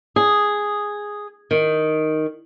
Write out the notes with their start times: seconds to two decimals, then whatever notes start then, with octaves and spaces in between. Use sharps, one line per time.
0.16 G#4
1.51 D#3